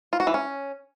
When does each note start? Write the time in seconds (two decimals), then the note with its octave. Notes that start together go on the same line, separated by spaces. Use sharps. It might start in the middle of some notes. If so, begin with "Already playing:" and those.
0.13 F4
0.20 F#4
0.27 E3
0.34 C#4